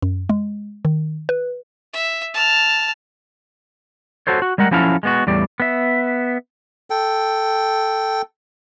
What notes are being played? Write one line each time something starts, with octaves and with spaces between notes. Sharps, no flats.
F#2
G#3
D#3
B4
E5
A5 F6
F#4 A4 C5 C#5
F#4
G3 G#3 A#4 F#5
F3 F#3 C#4 E4 A4 F5
G#3 B3 F#4
E2 A2 G3 D5
B3 E5
A4 G5